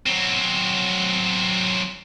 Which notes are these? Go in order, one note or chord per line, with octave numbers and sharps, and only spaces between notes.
F#3 C4